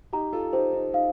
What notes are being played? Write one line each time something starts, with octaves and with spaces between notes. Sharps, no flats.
D#4 G4 A#5
F4 A4
D#4 G4 C5
D#4
D#4 F5